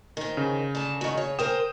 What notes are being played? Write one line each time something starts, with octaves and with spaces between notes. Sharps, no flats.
D#3 C4
C#3
D3 A5
D#3 F#4
C#5
A#4 C5 G5 G#5 D#6 E7